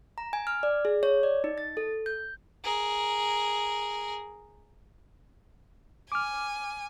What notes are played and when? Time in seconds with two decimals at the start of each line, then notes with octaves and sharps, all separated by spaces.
0.18 A#5
0.33 G#5
0.47 F6
0.63 D5
0.85 G#4
1.03 C#5
1.23 D5
1.44 D#4
1.58 A6
1.77 A4
2.06 G6
2.63 G#4 A#4
6.12 G#5 D6 F6